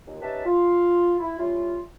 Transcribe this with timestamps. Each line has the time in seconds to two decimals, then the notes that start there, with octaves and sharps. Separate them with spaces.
0.06 D#2 A#2
0.22 C#4 D#4 G4 B4 E5 A5
0.45 F4
1.19 E4
1.38 G3 C#4 E4 F4